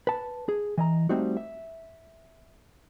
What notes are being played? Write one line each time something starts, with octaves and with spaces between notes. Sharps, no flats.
B4 A5
G#4
E3 D#5 A#5
G3 A3 C4 D#4 F#4
E5